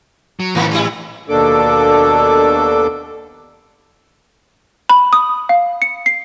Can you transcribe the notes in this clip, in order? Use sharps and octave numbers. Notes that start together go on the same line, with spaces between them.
F#3
A2 D#3 E3 A#3
G3 E4
D#2 B2 A#3 D4 A4 D6
B5
D#6
F5
C#7
C7